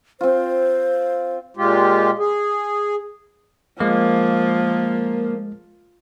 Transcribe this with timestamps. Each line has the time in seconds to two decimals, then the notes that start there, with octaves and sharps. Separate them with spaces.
0.21 C4 F4 C5
1.57 A#2 G#3 F4 G4
2.19 G#4
3.80 F3 G#3 A#3